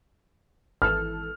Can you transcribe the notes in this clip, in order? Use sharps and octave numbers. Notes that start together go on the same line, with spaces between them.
G#1 E3 A4 F6